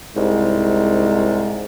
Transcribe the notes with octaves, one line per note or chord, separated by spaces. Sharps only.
C2 G#2